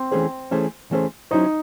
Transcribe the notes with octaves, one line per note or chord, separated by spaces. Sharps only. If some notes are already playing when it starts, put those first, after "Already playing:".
Already playing: C4
E3 A3 C#4 G#4 C5
E3 A3 C#4 G#4 C5
E3 A3 C#4 G#4 C5
F#3 C#4 D#4 E4 C5